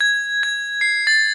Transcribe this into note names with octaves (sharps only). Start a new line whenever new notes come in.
G#6
G#6
C7
A6